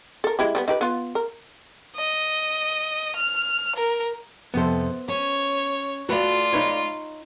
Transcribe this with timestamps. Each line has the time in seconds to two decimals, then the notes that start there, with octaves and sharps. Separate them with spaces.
0.24 A4 A#4
0.39 G#3 E4 G4
0.55 G3 A3 B3
0.68 D#4 G4 B4
0.81 B3 F4
1.15 A#4
1.96 D#5
3.16 F6
3.76 A#4
4.54 F2 C3 B3 A4 C5
5.08 C#4 C#5
6.09 A3 F4 F#4 B4 D5
6.53 D#4 B4 C#5